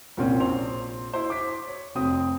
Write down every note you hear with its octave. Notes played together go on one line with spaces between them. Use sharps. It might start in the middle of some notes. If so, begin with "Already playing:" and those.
C2 A#2 C4 C#4
A#1 C5 F7
E4 C5
D6 B6
C#5
F1 C4 D#6